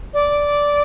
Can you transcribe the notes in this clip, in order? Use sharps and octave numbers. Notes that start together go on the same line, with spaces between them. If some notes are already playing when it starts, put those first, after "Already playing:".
D5